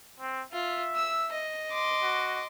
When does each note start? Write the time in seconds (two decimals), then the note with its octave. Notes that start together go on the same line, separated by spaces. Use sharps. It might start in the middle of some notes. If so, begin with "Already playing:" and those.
0.20 C4
0.53 F4 E5
0.96 E6
1.32 D#5
1.72 C6 D6
2.03 F#4